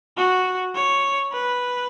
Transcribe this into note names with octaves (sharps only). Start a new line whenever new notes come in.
F#4
C#5
B4